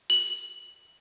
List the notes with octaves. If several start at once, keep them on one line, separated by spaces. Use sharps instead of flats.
F#7